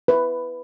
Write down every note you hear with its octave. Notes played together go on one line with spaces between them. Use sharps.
B4